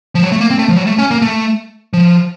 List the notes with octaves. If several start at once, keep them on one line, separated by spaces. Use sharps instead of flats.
F3
F#3
A3
A#3
C4
A3
F3
F#3
A3
C#4
A#3
A3
F3